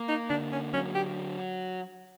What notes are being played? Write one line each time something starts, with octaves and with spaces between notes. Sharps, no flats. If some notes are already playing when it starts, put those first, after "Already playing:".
Already playing: A#3
D#4
D3 D4
C#4
F#3 C#4
G4